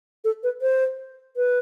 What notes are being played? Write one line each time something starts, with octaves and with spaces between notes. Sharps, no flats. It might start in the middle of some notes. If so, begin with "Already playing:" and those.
A4
B4
C5
B4